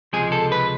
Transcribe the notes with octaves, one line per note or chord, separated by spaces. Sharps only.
C#2 C3 F3 G#3 G#4
A4
B4